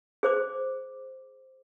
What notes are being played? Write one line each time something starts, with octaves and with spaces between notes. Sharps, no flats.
G#4 C5 D6